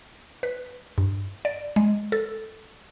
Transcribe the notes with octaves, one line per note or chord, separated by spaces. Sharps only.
B4
G2
D5
G#3
A4